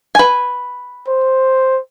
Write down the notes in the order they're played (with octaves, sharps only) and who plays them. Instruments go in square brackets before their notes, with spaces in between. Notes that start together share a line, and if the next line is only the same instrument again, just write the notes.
[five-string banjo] B4 G#5
[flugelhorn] C5